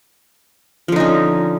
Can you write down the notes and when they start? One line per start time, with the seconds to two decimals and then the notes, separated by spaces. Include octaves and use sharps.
0.88 F3
0.92 D3
0.96 D#4
1.00 C#4